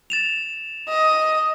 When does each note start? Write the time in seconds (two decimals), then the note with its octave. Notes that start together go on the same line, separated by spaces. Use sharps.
0.10 A6 E7 F7
0.89 D#5